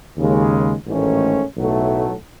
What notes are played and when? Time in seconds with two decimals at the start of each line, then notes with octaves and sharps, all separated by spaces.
0.17 D#2 C#3 G#3
0.87 A1 G#2 D#3 A3 C#4
1.57 B1 A2 F#3 A3